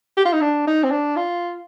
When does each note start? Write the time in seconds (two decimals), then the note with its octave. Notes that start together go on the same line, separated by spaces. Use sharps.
0.17 G4
0.25 F4
0.33 D#4
0.41 D4
0.67 D#4
0.83 C4
0.91 D4
1.17 F4